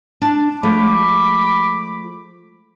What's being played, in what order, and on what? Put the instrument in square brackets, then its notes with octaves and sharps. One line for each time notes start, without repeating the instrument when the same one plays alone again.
[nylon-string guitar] D4 A5
[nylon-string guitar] F3 G#3 A3 [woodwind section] B5 D6